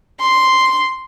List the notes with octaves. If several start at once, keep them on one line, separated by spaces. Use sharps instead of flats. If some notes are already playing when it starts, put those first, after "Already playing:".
C6